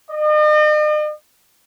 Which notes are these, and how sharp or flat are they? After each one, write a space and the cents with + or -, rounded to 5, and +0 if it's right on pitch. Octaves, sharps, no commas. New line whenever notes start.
D#5 -45